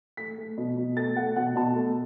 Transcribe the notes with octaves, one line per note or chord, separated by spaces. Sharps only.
A3 B6
A3
B2
B2
A3 A6
A3 F#5
B2 F#5
B2 A5
A3